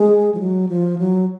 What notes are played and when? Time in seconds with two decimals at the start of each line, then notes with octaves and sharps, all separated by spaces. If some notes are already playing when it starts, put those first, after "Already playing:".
Already playing: G#3
0.34 F3
0.40 F#3
0.69 F3
0.99 F#3